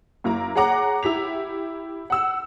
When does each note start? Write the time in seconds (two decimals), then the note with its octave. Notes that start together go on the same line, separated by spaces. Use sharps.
0.24 F#2 A#3 E4 A#5
0.55 G#4 C#5 F#5 A#5 D6
1.03 E4 G4 B6 F7
2.10 F#5 E6